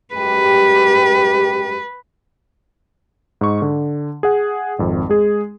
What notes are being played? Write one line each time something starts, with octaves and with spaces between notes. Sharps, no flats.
F#2 G#3 G4 B4
G#2 D#5 C#6
D3
G#4 F#5
G#1 F2
G#3 G#4